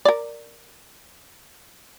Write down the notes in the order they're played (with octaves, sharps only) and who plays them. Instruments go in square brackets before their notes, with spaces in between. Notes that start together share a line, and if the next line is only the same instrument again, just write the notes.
[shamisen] A#4 D5